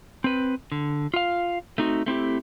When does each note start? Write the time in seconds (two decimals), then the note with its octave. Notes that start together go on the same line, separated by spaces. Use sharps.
0.24 C4 B4
0.72 D3
1.14 F4 F5
1.78 A3 C4 D#4 F#4
2.06 A3 C4 E4 G4